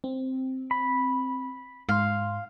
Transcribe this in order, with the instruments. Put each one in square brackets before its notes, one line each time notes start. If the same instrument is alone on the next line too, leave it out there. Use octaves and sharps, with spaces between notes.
[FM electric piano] C4
[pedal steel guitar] B5
[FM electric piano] G#2 C6 [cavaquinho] F5